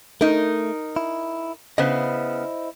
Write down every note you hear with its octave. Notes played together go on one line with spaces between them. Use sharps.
A3 D#4 A#4
E4
C#3 B3 E4 C5 D#5